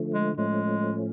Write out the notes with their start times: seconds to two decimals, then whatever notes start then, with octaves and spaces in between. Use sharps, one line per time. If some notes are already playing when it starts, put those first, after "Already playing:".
Already playing: D3 F3 A3
0.14 G#3
0.37 A2 F3 G#3 A3 C#4